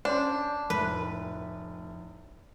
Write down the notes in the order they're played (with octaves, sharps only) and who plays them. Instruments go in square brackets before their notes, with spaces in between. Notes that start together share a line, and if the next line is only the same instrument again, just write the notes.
[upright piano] C#4 C5 C6 [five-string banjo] D4
[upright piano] F1 A2 [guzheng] B4